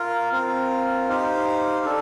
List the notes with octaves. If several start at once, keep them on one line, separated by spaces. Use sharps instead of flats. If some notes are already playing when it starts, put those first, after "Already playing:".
Already playing: F4 A#4 F5
C4 F4 A#4 F5
D#4 G4 C5 F5
D4 A4